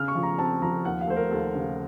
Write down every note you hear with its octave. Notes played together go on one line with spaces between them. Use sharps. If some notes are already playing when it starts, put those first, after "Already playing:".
Already playing: C#3 F6
C#6
F3
A#5
C4 A5
F3 A#5
D#2 F#5
F5
A3 C5
A#4
D#2 A4
C#3